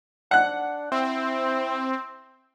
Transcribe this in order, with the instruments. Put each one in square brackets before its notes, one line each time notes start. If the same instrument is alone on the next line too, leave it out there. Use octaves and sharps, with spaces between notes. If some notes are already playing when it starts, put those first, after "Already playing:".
[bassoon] D4 [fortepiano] F#5 F#6
[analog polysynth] C4 [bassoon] E4